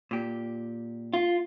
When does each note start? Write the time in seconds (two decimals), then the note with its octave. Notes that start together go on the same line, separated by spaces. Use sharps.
0.11 A#2 G4
1.13 F4